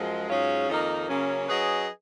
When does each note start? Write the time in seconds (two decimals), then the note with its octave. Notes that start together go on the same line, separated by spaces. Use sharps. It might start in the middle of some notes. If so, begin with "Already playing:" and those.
Already playing: F#2 F3 G#3
0.29 G#2 F#3 C#4 F4 G#4
0.68 F2 D#3 A#3 D#4 A#4
1.08 C#3 F#3 A#3 C#4
1.48 F#3 C#4 G#4 B4 D#5